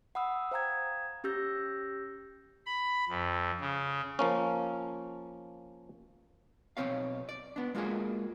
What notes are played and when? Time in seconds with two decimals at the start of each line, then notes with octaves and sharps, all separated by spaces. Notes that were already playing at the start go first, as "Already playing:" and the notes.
0.15 F#5 B5 D#6 E6
0.51 C5 F5 G5 A#5 D#6 G#6
1.24 C#4 G4 E6 G6 A#6
2.66 B5
3.09 F2
3.60 C#3
4.19 F3 A#3 C#4
6.77 B1 B2 F#3 C4 C#5 F5
7.29 D5
7.56 B3 D4
7.75 G#3 A#3 F4 F#4 G#4